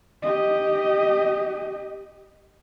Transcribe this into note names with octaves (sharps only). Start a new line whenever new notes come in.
G4 D#5